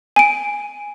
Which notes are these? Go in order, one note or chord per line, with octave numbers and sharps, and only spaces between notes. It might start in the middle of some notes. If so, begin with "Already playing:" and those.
G#5 D7